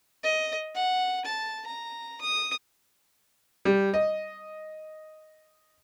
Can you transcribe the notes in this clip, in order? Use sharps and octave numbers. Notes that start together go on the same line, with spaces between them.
D#5
F#5
A5
A#5
D#6
G3
D#5